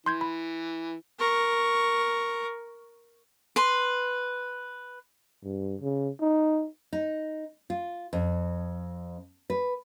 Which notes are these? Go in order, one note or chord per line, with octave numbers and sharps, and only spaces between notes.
E3 C6 G6 G#6
B5
A#4 C#6
B4 C6
G2
C#3
D#4
D#4
F4
F2
B4